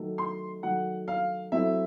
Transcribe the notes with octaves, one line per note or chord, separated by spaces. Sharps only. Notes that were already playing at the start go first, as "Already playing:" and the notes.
Already playing: D#3 F#3 A3
C6
D#3 F#3 A3 F#5
F5
F#3 A3 C4 E4 E5